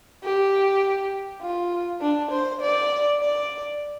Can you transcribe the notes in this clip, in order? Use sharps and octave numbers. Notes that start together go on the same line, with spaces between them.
G4
F4
D4
C5
D5
D5